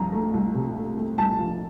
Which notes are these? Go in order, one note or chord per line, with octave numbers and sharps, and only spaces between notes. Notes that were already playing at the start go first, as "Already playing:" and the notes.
Already playing: C2 F3 A#5
A3
C2
C3
A3
A3
C2 A5
F3